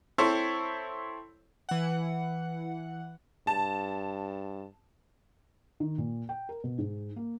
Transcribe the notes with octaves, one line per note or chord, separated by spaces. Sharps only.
C4 E4 A4 C5 C#5
E3 F#5
G2 A5
D#3
A#2
G5
A#4
B2
G#2
A#3